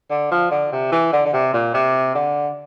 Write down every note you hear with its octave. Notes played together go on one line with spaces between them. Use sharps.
D3
F3
D3
C3
E3
D3
D3
C3
A#2
C3
D3